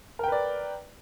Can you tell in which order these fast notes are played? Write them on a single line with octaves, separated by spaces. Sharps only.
A#4 G5 B4 D5